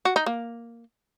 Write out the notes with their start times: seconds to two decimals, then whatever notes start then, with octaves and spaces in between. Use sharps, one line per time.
0.05 F#4
0.16 D#4
0.26 A#3